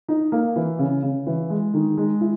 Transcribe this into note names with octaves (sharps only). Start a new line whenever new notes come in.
D#4
A#3
E3
C#3
C#3
E3
G#3
D#3
G#3
E4